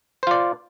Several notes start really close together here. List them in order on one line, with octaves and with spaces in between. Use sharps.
C5 F4 D5